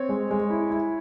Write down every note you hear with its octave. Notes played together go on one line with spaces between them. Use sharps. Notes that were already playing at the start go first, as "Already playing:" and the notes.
Already playing: C4 C#5
G#3
G#3
E4
E4